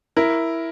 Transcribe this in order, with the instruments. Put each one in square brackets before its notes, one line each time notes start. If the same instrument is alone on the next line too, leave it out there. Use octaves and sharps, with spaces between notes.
[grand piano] E4 [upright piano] A#4